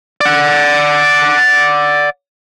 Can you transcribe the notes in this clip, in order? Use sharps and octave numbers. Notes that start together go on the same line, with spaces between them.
D5 F#5